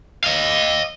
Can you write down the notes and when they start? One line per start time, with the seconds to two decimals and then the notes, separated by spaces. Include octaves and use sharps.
0.24 D#5 F5